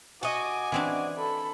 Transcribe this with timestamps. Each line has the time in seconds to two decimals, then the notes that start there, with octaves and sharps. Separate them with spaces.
0.23 F#4 D#5 G#5 D6
0.72 E3 C4 D4
1.18 A4 B5